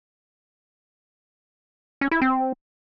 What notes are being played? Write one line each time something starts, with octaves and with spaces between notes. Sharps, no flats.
C#4
E4
C4